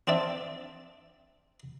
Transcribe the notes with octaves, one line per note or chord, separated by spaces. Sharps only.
C4 D4 D5 E5